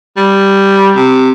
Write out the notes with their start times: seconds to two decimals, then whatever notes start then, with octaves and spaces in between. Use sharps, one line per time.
0.17 G3
0.96 C3